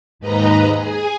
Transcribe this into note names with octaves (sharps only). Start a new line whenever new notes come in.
D#2 G#2 B4 D#5 A#5
G#4 G#5